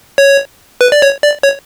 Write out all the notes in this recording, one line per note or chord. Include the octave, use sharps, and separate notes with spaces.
C#5
B4
D5
C#5
D5
C#5